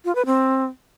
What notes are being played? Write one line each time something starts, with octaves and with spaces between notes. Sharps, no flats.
F4
B4
C4